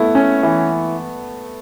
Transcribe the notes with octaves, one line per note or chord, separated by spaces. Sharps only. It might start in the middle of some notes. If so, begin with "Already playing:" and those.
Already playing: A3 B3 E4
C#4
E3